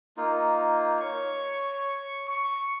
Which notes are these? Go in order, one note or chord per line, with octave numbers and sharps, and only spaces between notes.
A#3 D#4 F4
C#5 C#6
C#6